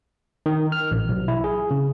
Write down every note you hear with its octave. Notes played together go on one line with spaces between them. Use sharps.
D#3
F6
A1
B1
E4
G#4
C#3